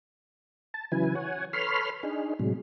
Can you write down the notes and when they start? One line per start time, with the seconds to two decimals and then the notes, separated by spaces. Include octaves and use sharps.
0.74 A5
0.92 C#3 E3 F#3 E4 B4 G#5
1.15 C#5 F#5 G#5
1.53 A4 B4 C#5 B5 C6 F6
2.03 D4 D#4 G#4
2.39 A2 C3 F#3 G#3